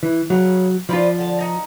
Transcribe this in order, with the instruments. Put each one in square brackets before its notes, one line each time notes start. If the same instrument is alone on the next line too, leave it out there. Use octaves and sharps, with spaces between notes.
[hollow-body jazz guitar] E3
[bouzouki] C#3 [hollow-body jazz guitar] F#3
[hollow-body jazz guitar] F3 F4 [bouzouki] B4 C5 D5
[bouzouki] D3 A5
D#4